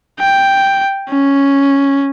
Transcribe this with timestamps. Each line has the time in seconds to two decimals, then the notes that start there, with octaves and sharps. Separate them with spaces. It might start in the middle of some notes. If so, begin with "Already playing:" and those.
0.20 G5
1.10 C#4